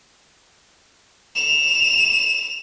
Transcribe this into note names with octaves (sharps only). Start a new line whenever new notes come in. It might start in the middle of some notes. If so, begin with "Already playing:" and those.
E7 F7